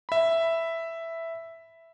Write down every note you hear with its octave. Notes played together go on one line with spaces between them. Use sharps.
E5 B5